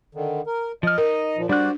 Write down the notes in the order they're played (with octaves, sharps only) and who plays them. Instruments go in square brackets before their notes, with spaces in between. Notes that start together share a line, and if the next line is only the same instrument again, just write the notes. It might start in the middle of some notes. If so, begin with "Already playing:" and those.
[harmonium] D3 D#3
A#4
[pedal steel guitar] F3 F6 [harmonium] D#5
[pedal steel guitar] D#4 [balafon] A#4
[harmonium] A#2 F3
[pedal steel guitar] G3 F#6 [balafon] D4 [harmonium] F#4 C5 D5